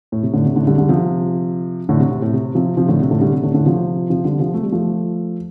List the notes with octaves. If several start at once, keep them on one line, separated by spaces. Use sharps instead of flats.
A2
C3
A2 D3
C3
A2 D3
D3 G3
D3 G3
C3 F3
A2 D3
C3
C3
A2
C3
C3 F3
C3 F3
A2 D3
C3
A2 D3
D3 G3
C3
A2 D3
A2 D3
C3 F3
C3 F3
D3 G3
C3 F3
A3
G3
F3 A3